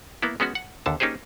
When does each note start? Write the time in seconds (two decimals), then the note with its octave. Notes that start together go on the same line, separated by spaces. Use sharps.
0.22 A#3 B3 E4
0.40 G#3 B3 C#4 F#4
0.55 F#5
0.86 D#2 D3 A5
1.00 A#3 C#4 D#4 G4 G#4 C5